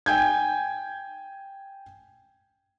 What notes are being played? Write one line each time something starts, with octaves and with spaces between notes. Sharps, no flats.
G5 G#5 G6 G#6